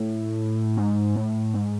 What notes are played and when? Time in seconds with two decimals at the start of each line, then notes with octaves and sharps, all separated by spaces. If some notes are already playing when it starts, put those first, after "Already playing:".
Already playing: A2
0.77 G#2
1.16 A2
1.53 G#2